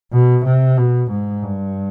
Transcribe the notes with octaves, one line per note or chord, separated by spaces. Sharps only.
B2
C3
B2
G#2
G2